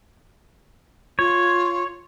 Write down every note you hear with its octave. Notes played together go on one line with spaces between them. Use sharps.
F4 C#5